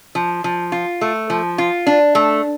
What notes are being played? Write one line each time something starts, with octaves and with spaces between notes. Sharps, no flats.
F3
F3
F4
A3
F3
F4
D4
A3